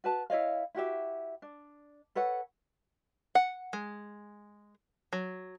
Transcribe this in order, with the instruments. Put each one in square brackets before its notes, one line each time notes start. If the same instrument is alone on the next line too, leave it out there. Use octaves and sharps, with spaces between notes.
[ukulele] F#4 B4 A5
E4 C#5 D#5 F5
E4 F#4 G4 E5
D4
A4 B4 C#5 F#5
[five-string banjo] F#5
G#3
F#3